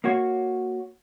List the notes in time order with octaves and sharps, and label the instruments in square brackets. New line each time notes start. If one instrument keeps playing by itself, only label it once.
[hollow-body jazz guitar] A#3 F#4 C#5